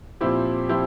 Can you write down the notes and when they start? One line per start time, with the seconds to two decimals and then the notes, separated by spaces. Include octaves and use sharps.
0.21 A#2 F3 C4 E4 G4
0.69 F3 C4 E4 G4